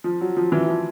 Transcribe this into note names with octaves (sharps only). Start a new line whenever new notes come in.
F3
F#3
F3
E3
F3